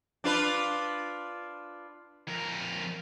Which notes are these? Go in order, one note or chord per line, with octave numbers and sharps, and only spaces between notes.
D4 F4 B4
F2 A#4